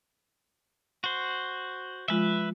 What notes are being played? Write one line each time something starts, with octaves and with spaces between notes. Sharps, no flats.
F#4 C5
F3 G#3 F4 B4 E5